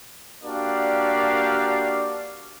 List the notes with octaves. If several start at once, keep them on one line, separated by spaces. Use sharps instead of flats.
A#3 D4 F#4 G4 D5 F5